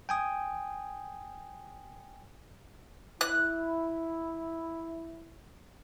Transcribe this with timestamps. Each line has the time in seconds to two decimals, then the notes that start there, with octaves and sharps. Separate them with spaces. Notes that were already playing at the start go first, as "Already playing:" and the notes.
0.09 G5 G#5 D#6
3.21 E4 F#6